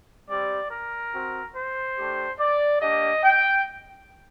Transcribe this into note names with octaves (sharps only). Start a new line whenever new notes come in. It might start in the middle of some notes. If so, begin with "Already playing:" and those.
G3 C4 G4 D5
A#4
C4 F#4
C5
A3 D4 G4
D5
A#3 D4 G4 D#5
G5